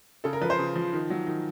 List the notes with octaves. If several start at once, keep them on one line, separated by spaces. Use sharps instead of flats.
C#3 A4
A#4
F3 B4
C5
C#3
F3
D#3
F#3
D#3